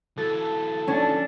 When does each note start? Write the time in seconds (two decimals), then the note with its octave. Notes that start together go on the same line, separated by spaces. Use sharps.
0.18 E3 F#3 A4
0.88 C#4 D4